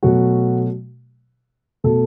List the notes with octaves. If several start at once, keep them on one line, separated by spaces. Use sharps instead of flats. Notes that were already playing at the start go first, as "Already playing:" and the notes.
B2 F#3 A3 F#4
B2 A3 A4